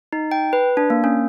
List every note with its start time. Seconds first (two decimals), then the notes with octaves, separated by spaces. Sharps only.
0.13 D#4
0.31 G5
0.53 B4
0.77 D4
0.90 A#3
1.04 C#4